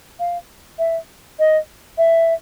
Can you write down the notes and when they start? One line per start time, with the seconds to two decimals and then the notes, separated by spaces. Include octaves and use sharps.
0.19 F5
0.79 E5
1.39 D#5
1.98 E5